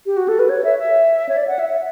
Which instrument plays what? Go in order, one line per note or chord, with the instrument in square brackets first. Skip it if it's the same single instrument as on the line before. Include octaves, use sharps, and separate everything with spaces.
[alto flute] G4
F#4
A4
B4
C#5
E5
E5
C#5
D5
F#5
E5
E5